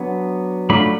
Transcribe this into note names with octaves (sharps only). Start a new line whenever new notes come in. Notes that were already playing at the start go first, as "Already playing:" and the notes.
Already playing: F#3 B3 D4
F#3 A3 D4 F4 B5